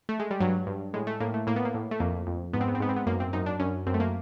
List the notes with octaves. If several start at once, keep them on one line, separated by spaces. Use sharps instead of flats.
A3
G#3
G3
G2 F#3
G2
A2 G#3
A3
A2 A#3
A3
A2 A#3
B3
A#3
A2
A3
F2 A#3
F2
G#2 B3
C4
B3
C4
G#2 B3
C4
B3
F#2 A#3
C4
F#2 D#4
D4
F#2 C#4
F#2 C4
A3
A#3